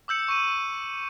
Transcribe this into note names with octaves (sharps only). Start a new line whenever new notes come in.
D6 E6 G6 C#7
C#6 C#7 D#7